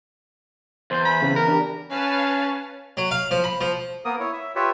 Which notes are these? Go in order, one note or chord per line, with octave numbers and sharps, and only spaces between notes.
E2 C5 C6 G6
B5
C#3 C4
A#4 F6
D4 G4
C#4 B4 F5 A5
F#3
F5
F3
B5
F3
A#3 B3 A#4 D#6
E4 C#5
E5
F4 G4 B4 C#5 E5